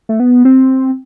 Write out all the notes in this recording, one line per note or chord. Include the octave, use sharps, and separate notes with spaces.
A3
B3
C4